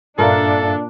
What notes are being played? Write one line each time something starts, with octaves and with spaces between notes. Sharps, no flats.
G2 A#2 D4 A4 A#4 E5 F5